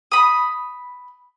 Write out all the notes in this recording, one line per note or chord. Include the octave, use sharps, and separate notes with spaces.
B5 D#6